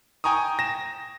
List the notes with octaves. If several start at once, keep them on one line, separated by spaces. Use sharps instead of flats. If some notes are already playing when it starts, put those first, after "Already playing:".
G5 G#5 A#5 C#6 D#6
A#6 E7